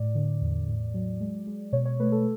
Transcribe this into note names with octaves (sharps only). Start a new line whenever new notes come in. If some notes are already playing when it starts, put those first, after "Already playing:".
Already playing: A2 D5
D3
E2
A2
F#3
G#3
G#3
B2 C#5
C#5
A3 B4
A4